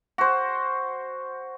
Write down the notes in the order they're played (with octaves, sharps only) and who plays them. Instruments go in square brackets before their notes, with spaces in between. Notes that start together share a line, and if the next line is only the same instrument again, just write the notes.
[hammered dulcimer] F#4 C5